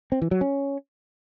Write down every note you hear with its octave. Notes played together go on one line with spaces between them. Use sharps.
C4
E3
F#3
C#4